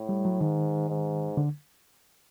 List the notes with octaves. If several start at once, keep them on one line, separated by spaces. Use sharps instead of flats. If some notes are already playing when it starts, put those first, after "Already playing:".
Already playing: A2
G3
F#3
G#2 D#3
G#2
D3